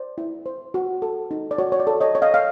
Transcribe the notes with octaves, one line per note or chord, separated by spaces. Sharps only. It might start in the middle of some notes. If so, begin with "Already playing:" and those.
Already playing: C5 D5
E4
C5
F#4
A4
D#4
D5
F#4 C#5
C#5
D5
A4
C#5 D#5
C#5
D#5 F5
F5